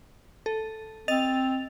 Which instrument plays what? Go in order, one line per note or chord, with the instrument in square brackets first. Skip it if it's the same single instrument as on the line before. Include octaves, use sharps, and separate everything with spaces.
[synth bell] A4
[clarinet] C4 [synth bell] D#5 A6 F7